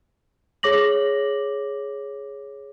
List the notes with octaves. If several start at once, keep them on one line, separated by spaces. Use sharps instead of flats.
G#4 C#5 D6 A#6 F#7